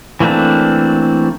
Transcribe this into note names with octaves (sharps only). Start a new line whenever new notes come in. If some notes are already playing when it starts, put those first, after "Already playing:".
E3 A3 A#3 C4 D4